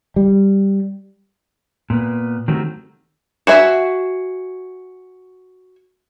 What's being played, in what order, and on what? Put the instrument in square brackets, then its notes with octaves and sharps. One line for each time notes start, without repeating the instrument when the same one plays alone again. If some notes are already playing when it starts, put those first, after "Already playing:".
[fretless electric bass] G3
[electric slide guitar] A#2 B3
D#3 F#3 A3 C4 F#4 G4
[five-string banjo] F#4 G#4 E5